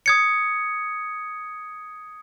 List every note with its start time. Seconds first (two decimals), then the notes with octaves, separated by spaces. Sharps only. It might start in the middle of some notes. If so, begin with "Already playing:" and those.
0.06 D#6 G#6 C#7